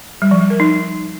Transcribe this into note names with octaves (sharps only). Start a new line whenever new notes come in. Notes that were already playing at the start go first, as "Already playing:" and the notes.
G3
F3
G3
A#4
D#4